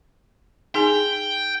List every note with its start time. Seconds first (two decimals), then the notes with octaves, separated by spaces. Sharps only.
0.75 D#4 G#4 G5 G#5